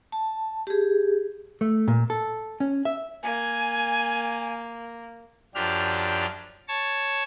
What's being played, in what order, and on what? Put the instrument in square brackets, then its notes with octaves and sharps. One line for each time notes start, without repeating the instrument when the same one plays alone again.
[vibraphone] A5
G4 G#4
[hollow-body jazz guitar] A3
A#2
A4
C#4
E5
[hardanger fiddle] A#3 [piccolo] G#5
[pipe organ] F#2 F3 D4 G4 F6
C#5 A5